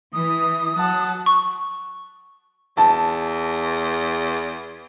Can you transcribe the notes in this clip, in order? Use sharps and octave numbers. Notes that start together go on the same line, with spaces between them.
E3 D#6
F#3 F#5 A5
C#6
E2 A5